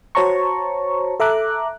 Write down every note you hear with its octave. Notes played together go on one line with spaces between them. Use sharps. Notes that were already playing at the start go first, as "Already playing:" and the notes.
F#4 C5 C#5 A5 A#5 C#6
A4 E5 A#5 D6 F#6